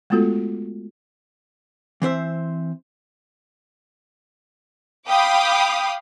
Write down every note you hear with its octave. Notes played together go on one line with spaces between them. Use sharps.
G#3 A3 B3 F4 F#4 A4
E3 C4 C5 E5
F5 G5 B5 D6 D#6